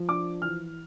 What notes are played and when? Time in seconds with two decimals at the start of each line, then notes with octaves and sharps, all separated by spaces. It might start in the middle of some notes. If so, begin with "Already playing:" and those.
Already playing: F3
0.09 D4 D6
0.42 E3 F6